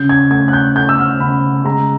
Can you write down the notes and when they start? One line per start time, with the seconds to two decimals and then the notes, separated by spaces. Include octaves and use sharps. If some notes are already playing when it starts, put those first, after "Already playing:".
Already playing: C#3 G6
0.09 G#6
0.31 A3 G#6
0.48 F#6
0.53 G6
0.76 A3 G6
0.89 E6
0.99 F6
1.20 C#3 B5
1.65 G#3 A#5